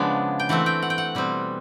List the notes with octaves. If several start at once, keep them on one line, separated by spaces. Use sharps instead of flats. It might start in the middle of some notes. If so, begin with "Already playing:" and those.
Already playing: C#3 F3 G#3 B3 D4
G5
E3 A3 C4 F#5
G5
F#5
G5
F#5
B2 G3 C4